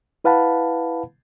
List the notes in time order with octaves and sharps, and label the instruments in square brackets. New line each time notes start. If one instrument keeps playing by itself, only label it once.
[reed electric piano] E4 B4 F5 F#5 A5 B5